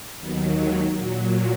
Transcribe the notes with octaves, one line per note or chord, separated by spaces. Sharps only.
D#2 D#3 F#3 B3
G#3
A#2 F#3 A#3